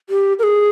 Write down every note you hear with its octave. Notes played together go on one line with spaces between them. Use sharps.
G4
A#4
G#4